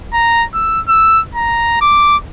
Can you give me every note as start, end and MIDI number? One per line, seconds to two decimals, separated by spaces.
0.13 0.45 82
0.54 0.80 88
0.88 1.21 88
1.35 1.77 82
1.81 2.16 86